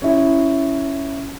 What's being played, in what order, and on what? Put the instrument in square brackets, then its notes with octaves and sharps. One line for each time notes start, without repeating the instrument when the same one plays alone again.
[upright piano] C#4 E4